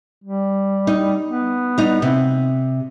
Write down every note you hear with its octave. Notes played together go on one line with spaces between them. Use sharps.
G3
D#4
B3
G3 D#4
C3